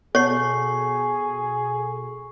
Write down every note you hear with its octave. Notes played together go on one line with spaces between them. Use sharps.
B2 F#4 G#4 A4 C#5 C#6 C7